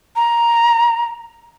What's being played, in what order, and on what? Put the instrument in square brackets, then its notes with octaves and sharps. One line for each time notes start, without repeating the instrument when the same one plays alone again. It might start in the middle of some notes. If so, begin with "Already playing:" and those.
[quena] A#5